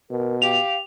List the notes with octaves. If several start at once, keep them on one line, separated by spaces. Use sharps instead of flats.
B2 A#4
G4 F5 F7